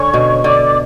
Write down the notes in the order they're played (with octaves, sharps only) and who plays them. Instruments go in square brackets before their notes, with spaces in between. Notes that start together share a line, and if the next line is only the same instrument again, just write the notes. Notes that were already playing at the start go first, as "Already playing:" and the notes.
Already playing: [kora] D3 C#4 [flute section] C#5 C#6
[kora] B2
[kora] D3 [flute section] D5 D6